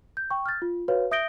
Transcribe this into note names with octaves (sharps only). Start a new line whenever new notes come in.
G6
G5 C#6
F6 G6 A6
F4
F#4 B4 C#5 F5
E5 D#6 G6 A#6 D7 G7